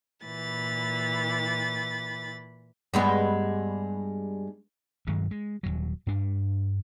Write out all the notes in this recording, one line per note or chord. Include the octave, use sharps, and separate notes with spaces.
A#2 E3 B5 A6
G2 G#3 B3
G2 D#3 F#3 G#3
G#3
D#1 C2 F#3
G2 D4